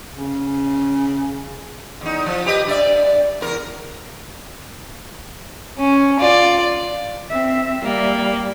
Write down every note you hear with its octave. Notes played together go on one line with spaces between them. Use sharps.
C#3
E2 D#4
F3
G4 B4 D#5
G2 D5 E5
E2 A#4
C#4
F4 D5
C4 E5
G3 A#3